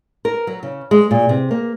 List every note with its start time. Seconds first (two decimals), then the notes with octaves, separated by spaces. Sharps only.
0.25 A#4
0.47 F#3
0.63 C#3
0.91 G#3
1.11 A#2
1.29 C3
1.51 A#3